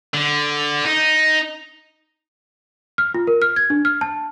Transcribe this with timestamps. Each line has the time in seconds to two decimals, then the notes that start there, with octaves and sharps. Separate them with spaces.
0.14 D3
0.85 D#4
2.98 F6
3.14 F4
3.27 A#4
3.42 F6
3.56 G#6
3.70 D4
3.85 F6
4.01 A5